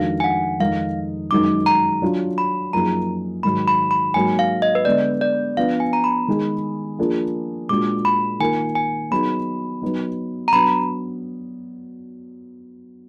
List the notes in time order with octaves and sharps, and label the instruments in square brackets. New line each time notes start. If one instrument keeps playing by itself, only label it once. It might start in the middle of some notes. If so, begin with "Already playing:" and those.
Already playing: [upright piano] F2 D#3 G#3 D4 F#4 [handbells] F5
[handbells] G#5
F#5
[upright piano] F2 D#3 G#3 D#4 [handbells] F5
[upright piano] F#2 D#3 G#3 D#4 F#4 [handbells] D6
[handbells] A#5
[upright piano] F#3 D4 F4
[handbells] B5
[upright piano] F#2 F3 A#3 D#4 G#4 [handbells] A#5
[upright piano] G#2 D#3 F#3 [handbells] B5
[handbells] B5
B5
[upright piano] G#2 F#3 A#3 [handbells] G#5
[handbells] F5
D#5
B4
[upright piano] D3 G#3 B3 [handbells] D5
[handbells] D5
[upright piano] F3 B3 D4 [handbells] F5
[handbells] G#5
A#5
B5
[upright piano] D#3 G#3 D#4 G#4
F3 A#3 D4 F4 G#4
[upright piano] A#2 G#3 D4 F#4 [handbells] D6
[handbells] B5
[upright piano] D#3 A#3 F4 A#4 [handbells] G#5
[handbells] G#5
[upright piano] F#3 B3 D#4 G#4 [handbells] B5
[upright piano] F#3 B3 D#4
[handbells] A#5
[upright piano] F#3 B3 D4 [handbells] B5